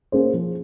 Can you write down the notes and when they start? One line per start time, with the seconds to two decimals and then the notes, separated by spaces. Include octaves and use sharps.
0.12 A#3 C#4 G#4 C5
0.33 F3